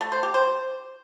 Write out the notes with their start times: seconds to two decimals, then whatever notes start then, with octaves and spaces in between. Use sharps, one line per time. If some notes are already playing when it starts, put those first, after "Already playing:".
0.01 A3
0.12 C5
0.23 G4
0.34 C5